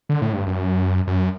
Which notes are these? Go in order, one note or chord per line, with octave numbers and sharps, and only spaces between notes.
D3
A2
G2
F#2
F#2